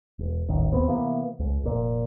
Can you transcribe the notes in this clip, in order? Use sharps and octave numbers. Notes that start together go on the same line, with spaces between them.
E1
D#1 A1 D#3
D#2 B3 C4
C3 E3 A#3 B3
C#2
F1 A#2